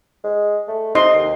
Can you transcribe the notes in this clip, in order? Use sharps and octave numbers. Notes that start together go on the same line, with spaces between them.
G#3
A3
C3 D#4 D#5 C6
D#2